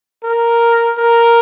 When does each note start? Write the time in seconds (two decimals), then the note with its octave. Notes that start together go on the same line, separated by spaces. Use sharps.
0.24 A#4
0.97 A#4